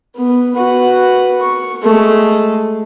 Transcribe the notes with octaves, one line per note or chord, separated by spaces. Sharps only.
B3
F#4 B4
C#6
G#3 A3